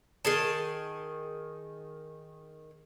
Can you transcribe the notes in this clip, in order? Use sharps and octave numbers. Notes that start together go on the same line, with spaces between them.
D#3 G#4 A5